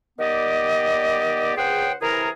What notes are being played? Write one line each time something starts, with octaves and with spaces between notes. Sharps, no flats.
D#3 G3 B3 G4 D5 D#5
C#2 C#3 G#4 C5 F#5 G5
C3 E3 E4 G#4 A#4